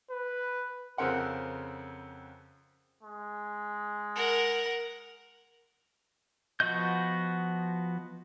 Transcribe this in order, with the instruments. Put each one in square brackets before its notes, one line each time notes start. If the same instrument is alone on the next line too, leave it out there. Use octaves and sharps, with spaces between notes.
[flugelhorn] B4
[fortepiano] F2 C#3 C4 A#4 F#5 C6
[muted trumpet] G#3
[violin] A#4 F#5
[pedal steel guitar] F3 B3 F#4 D#5 G6